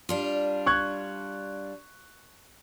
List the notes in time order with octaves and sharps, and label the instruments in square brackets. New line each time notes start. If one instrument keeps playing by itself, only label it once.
[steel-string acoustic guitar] G3 D4 F4
[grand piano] C#6 F#6 G#6